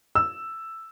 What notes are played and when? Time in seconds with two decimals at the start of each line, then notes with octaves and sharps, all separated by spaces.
0.15 E6